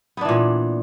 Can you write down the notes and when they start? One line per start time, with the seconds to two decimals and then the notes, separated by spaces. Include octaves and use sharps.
0.17 B3
0.21 D4
0.25 E3
0.29 A#2